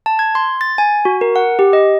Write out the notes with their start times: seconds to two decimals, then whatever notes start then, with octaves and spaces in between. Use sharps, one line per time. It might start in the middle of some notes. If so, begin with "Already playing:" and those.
0.06 A5
0.19 G#6
0.35 C6
0.61 A6
0.78 G#5
1.05 F#4
1.21 A#4
1.36 F#5
1.59 G4
1.73 D#5